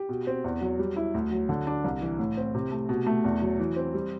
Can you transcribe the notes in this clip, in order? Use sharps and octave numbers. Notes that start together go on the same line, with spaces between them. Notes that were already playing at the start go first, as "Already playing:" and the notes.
Already playing: G4
B2
C4
E2
F#3
G3
E4
D2
F#3
D3
D4
C2
E3
A2
C4
C3
A3
B2
A3
E2
F#3
E3
C4
G3